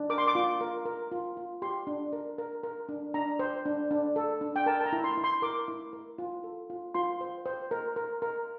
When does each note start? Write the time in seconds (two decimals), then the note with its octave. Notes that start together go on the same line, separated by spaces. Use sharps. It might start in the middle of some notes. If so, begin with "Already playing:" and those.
Already playing: D4
0.10 A#4 D6
0.18 C6
0.28 D6
0.35 F4
0.61 A#4
0.85 A#4
1.12 F4
1.37 F4
1.62 G4 C6
1.87 D4
2.13 A#4
2.38 A#4
2.63 A#4
2.89 D4
3.14 D4 A#5
3.39 C5
3.65 D4
3.91 D4
4.16 A4
4.41 D4
4.56 G5
4.66 A#4 A5
4.81 A5
4.86 A#5
4.93 E4
5.04 C6
5.18 E4
5.24 C6
5.42 A#4 D6
5.68 E4
5.93 A#4
6.18 F4
6.44 A4
6.70 F4
6.94 F4 C6
7.21 C5
7.46 C5
7.71 A#4
7.96 A#4
8.22 A#4